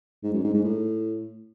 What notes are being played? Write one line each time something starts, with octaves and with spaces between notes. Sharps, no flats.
G#2
F#2
G#2
G#2
A2